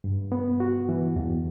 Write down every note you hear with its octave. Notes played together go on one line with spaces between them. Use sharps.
G2
B3
F#4
E3
E2